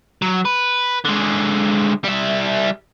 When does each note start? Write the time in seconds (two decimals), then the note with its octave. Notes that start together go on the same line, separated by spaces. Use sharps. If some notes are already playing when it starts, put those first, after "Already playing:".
0.22 F#3
0.45 B4
1.05 D3 G#3
2.04 G3 E5